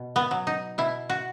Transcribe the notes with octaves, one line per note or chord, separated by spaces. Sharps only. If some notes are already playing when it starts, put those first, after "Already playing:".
Already playing: B2
B3
F#3
D#4
B2 E4
F#4